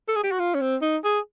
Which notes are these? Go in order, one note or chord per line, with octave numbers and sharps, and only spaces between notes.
A4
G#4
G4
F#4
F4
C#4
C4
D#4
G#4